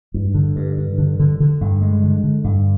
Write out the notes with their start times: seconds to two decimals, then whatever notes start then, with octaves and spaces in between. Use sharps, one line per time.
0.14 G2
0.34 D3
0.56 G2
0.77 G2
0.98 D3
1.20 D3
1.40 D3
1.61 G2
1.81 G#3
2.03 D3
2.23 D3
2.44 G2